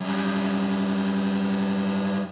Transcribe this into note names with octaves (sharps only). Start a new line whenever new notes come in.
F#2 G3